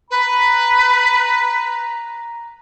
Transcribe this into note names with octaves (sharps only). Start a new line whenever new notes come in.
B4 A#5